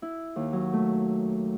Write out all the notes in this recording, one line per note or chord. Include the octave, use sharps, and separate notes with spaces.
E4
D#2
F#3
A3